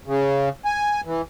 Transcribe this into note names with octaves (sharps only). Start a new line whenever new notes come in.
C#3
G#5
E3